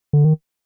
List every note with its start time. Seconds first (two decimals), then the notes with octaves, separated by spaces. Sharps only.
0.13 D3
0.24 D#3